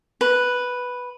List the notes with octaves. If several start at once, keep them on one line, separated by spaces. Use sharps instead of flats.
B4